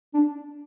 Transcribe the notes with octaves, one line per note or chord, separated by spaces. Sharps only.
D4